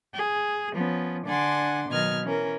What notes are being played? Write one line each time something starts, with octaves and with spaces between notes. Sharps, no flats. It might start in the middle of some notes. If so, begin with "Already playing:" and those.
G#4
F3 B3 C#4
D3 D4 F#5 G#5 C6 D6
B2 D#3 F#3 D#5 F6 G#6
E3 C#4 A#4